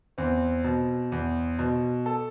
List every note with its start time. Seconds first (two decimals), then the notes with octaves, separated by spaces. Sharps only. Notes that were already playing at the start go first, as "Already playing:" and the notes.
0.18 E2 C4
0.64 B2
1.12 E2
1.59 B2
2.06 A4